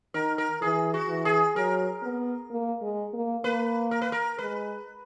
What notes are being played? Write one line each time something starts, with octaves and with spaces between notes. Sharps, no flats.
D#3 A#4
A#4
E3 G#4
F#4
E3
G#4
F#3 A#4
B3
A#3
G#3
A#3
A#3 B4
A#4
B4
A#4
G#3 B4